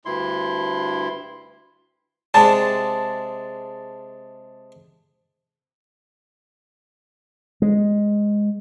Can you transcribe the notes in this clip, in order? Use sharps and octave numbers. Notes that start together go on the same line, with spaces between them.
D2 G2 E4 C6
C3 G#3 D4 A5
G#3